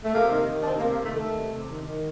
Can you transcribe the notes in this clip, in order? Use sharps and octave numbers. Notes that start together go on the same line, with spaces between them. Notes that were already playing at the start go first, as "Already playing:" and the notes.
A3
C3 A#3
D#3
D#3
D4
C3 C4
A#3
C3
A#3
D#3 A3
D#3 A3
C3
C3
D#3
D#3